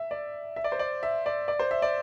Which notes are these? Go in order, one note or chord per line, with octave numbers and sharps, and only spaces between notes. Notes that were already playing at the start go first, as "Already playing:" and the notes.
Already playing: E5
D5
E5
D5
C5
D5
E5
D5
D5
C5
E5
D5